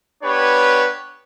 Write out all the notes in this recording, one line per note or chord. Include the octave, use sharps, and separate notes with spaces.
B3 D4 G4 B4 C#5